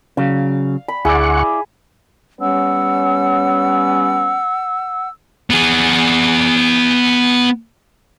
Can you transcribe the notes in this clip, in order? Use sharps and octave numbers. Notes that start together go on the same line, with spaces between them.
C#3 F#3 F5
B5
D2 E4 G#4 D5 F#5 C#6
G3 B3 C#4 F#5 E6
B3 G#4